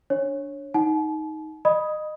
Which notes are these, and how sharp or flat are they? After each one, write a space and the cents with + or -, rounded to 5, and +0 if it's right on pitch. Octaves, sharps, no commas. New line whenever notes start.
D4 -15 C#5 -15
D#4 +10 F#5 +15 A5 -45
D#5 -25 B5 -10 D#6 +10